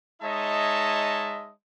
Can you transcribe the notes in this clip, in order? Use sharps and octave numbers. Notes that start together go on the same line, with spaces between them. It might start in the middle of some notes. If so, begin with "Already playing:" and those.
G#3 D#4 C#5 D#5 E5 A5